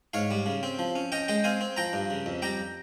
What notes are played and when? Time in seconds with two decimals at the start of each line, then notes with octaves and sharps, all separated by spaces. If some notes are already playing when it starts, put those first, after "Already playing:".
0.14 G#2 C#5 F5
0.31 G3
0.46 C#3
0.63 C4
0.79 F3
0.95 C#4
1.12 C#4 D#5 G5
1.28 G#3 D#5 G5
1.44 C4 F5 G#5
1.61 C4
1.77 F3 G5 A#5
1.93 G2
2.10 C#3
2.26 F2
2.42 G3 G5 A#5